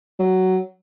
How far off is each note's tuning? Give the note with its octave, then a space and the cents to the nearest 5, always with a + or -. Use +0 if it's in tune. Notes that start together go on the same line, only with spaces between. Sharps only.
F#3 +10